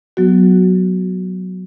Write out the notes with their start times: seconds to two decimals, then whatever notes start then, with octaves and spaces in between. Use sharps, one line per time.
0.17 F#3 B3 F#4